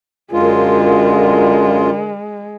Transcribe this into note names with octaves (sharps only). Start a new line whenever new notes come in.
F#2 D3 G#3 F4 A#4